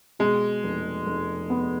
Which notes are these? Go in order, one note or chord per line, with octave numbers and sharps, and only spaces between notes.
B2 G#3
F1
F1
B3